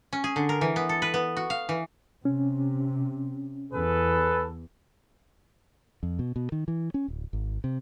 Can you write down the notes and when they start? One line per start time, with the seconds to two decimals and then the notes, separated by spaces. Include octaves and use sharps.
0.13 C#4
0.24 G#4
0.36 D3
0.49 A#4
0.61 E3
0.76 B3
0.89 A4
1.02 B4
1.14 B3
1.37 F#4
1.50 F5
1.69 E3
2.25 C3 C#4
3.73 E2 G#4 A4 B4
6.03 F2
6.19 B2
6.36 B2
6.52 D#3
6.68 E3
6.94 C#4
7.08 D1
7.33 G#1
7.64 C3